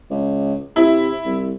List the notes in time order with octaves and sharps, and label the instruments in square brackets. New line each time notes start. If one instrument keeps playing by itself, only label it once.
[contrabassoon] C#2
[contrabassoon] C3 [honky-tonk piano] E4
[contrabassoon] C2